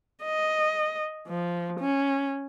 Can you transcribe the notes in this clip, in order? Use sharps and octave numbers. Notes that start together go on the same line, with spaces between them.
D#5
F3
C#4